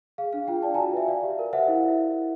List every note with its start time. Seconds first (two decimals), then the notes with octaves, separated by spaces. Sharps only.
0.18 G#4 F5
0.33 D4 F5
0.48 F4 F5 G5
0.62 D5 G5 A5
0.74 G#5 A#5
0.78 F#4
0.93 B4 E5
1.08 D5 F5
1.24 G4
1.39 A#4
1.53 C5 E5 F#5
1.68 E4